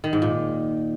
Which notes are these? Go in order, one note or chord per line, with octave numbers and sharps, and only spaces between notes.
D#3
G#2
A#2